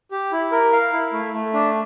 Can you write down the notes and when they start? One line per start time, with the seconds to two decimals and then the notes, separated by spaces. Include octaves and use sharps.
0.11 G4
0.32 E4
0.52 A#4
0.72 F5
0.93 E4
1.13 A3
1.34 A3
1.54 D4